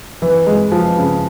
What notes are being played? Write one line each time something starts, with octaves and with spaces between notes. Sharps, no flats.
E3
G#3
F3
C#3